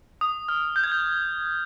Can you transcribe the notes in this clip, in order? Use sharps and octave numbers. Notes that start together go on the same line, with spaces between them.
D#6
F6
G6
G#6
G6